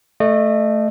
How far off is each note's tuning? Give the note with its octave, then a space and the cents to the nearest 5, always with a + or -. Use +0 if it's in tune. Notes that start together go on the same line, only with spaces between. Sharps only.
A3 +0 D#5 -35